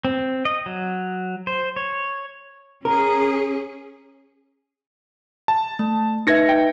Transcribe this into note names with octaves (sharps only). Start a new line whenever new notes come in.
C4
D#5
F#3
C5
C#5
C#4 G#4 A#4
A5
A3
D#4 B4 E5 G#6 A#6 C#7
G5